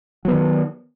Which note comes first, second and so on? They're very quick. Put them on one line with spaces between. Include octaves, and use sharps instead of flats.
F#3 B3 D#3